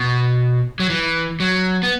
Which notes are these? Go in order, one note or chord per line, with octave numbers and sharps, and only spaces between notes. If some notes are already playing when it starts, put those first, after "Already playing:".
Already playing: B2
F#3
E3
F#3
B3